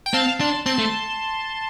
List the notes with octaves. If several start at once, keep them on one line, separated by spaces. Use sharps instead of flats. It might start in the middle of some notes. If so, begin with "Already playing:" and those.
G5
C4 F5 A5
D4 A5 C6
C4 A5 C6
A3